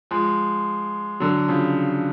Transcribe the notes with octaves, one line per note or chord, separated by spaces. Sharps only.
F3 G#3
D3 F#3
C#3 F3